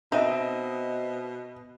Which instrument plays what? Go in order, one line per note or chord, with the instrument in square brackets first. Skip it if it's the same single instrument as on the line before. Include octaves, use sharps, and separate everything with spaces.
[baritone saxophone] B2 [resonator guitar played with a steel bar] C4 [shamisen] D#4 [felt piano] D#5 E5